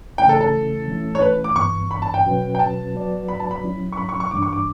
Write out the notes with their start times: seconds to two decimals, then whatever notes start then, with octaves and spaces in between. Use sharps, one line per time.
0.18 C#3 E3 A3 C#4 E4 G5
0.29 A4
0.41 A4
0.88 E3 A3 C#4 E4
1.15 C#5
1.21 B4
1.44 D6
1.56 G2 E3 B3 C#6
1.91 B5
2.02 A5
2.14 G5
2.25 B2 F#3 C#4 F#4 B4
2.55 G5
2.59 A5
2.94 F#3 B3 F#4 B4 D5
3.28 B5
3.40 A5
3.51 B5
3.63 F#3 C#4 E4
3.92 C#6
3.97 B5
4.09 C#6
4.20 C#6
4.31 G2 E3 G3 D4 D6
4.42 C#6
4.53 D6